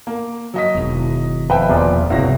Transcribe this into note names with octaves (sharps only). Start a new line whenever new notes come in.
A#3
F#3 D#5 B6
E1 D#3
F2 B4 E5 G5
E2 A#2 F3
G1 C#2 C3 E4 F#4 C#5 D5 A#6